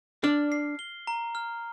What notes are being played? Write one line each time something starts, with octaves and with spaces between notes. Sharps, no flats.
D4 D5 F6
C7
G7
A#5
F6